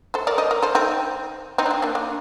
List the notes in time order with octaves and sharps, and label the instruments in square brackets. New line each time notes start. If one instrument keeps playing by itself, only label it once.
[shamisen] A4 C5
A#4 D5
C5 D#5
A#4 D5
A4 C5
C4 D#4
C4 D#4
D4
C4
A#3 D4
A#3 D4